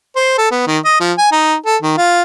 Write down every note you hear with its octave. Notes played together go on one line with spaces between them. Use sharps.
C5
A4
B3
D#3
D#5
F3
G#5
D#4
A4
D#3
F4